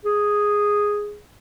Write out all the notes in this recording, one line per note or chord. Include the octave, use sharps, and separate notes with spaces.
G#4